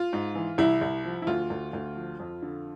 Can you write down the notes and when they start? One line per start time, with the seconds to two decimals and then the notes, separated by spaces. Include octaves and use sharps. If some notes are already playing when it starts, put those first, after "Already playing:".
Already playing: F4
0.13 G#2
0.35 E3
0.58 C2 E4
0.81 C2
1.05 F3
1.22 E4
1.27 D2 F4
1.50 D2
1.73 D2
1.96 F3
2.20 F2
2.42 D3